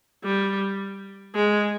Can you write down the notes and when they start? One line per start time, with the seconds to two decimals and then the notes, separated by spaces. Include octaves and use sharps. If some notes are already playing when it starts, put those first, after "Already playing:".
0.24 G3
1.35 G#3